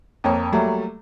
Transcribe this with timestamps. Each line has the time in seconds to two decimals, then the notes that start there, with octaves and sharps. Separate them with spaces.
0.24 F2 A#3 C#5
0.53 F#3 G3 A3 A#3